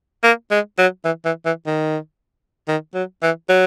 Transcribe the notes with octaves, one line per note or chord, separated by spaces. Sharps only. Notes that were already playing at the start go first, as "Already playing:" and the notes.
A#3
G#3
F#3
E3
E3
E3
D#3
D#3
F#3
E3
F#3